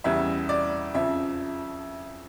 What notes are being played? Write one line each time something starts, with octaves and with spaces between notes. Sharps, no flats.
E2 C#3 E3 G3 E5
D5
F2 C#3 F3 E5